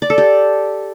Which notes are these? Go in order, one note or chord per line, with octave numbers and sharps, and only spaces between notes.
D5
A4
G4